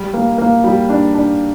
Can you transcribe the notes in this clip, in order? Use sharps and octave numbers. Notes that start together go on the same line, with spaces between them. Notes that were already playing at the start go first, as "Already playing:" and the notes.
Already playing: G3
A#3
A#3
G3
D4
D4